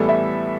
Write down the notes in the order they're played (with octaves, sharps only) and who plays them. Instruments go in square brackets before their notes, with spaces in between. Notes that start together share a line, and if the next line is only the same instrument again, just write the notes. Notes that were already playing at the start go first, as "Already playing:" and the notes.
Already playing: [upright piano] A2 E3 G3 B3 E4 [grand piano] A4
[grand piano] E5